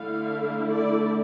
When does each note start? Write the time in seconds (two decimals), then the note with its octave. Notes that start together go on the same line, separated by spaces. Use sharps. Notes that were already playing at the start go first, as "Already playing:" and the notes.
Already playing: D3 A3 E4 F5
0.69 D5